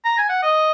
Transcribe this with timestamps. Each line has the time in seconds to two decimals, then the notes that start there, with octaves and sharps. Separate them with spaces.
0.05 A#5
0.18 G#5
0.29 F#5
0.43 D#5